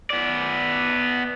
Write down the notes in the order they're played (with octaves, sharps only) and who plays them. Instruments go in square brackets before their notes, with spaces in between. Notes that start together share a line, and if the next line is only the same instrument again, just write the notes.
[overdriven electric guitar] B3 D5